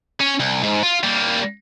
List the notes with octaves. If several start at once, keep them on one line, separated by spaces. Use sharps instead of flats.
C#4
C2
G#2
F4
G3 A#3